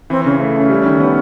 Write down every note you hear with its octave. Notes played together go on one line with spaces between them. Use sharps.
E3 C4
C#3 C#4
A3
A3 C#4
G3
D#3
B3